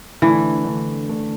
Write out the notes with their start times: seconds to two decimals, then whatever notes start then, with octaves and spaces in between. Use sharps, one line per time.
0.22 D3 E3 A3 D4
0.65 D3 A3 D4
1.09 D3 A3 D4